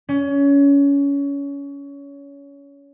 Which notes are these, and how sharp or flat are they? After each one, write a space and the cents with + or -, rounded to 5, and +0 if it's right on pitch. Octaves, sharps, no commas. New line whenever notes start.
C#4 +25